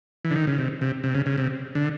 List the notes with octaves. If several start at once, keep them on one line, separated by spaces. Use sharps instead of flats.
E3
D3
D#3
C#3
C3
C3
C3
C#3
C#3
C3
D3